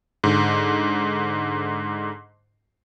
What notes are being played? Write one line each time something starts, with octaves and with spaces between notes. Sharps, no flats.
G#2 D3